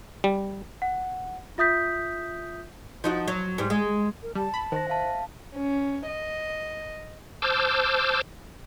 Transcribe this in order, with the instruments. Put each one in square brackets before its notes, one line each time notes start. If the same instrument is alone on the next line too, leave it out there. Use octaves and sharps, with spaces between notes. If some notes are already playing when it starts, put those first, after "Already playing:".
[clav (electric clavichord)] G3
[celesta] F#5
F4 E5 D#6 G6 B6
[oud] F3 D#4 F#4
F#3
G#2 G3
G#3
[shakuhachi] A#4
[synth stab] G3 [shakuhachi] A5
[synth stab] B5
[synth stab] D#3 [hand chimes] C5 A#6
[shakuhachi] E5 [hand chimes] F5 A5
[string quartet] C#4
D#5
[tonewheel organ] C5 A5 D6 E6 F6 G6